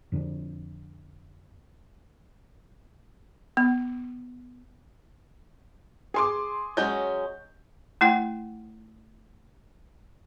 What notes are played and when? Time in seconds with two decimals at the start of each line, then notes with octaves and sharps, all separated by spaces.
0.12 F2 D3 A#3 D4
3.57 B3
6.14 G#4 C6 D6
6.77 F#3 G#3 C#4 G6
8.01 A3 E4 F#5 G5